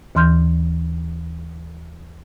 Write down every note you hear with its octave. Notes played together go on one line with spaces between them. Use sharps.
D#2 E3 C6 F6 G6